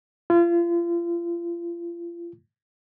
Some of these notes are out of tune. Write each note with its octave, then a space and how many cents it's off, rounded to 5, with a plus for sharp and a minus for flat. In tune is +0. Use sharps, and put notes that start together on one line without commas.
F4 -35